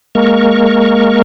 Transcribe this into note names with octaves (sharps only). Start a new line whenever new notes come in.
G#3 A#3 A#4 C#6